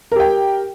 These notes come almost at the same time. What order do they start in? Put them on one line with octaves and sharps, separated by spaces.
A#4 G4 G5